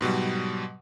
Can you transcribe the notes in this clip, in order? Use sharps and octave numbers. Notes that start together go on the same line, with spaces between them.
G#2 B2 F#3 G3